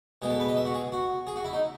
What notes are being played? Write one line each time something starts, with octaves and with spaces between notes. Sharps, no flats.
B2 G#3 G#4
A4
B4
D#5
E5
F#4
G#4
F#4
G#4
F#4
E4
D#4